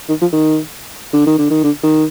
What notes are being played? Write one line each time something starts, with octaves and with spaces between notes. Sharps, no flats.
D#3
F3
D#3
D3
D#3
D3
D#3
D3
D#3